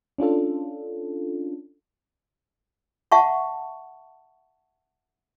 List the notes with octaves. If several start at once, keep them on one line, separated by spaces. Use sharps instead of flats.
C#4 D4 F4 A4
E5 F#5 A5 C#6